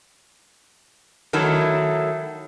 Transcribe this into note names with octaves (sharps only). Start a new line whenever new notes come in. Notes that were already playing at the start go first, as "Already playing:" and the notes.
D#3 F#3 A3 E4